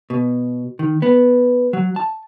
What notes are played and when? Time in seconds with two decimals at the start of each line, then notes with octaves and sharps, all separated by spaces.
0.10 B2
0.79 D#3
1.02 B3
1.73 F#3
1.96 A5